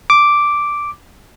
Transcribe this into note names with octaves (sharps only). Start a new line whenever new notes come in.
D6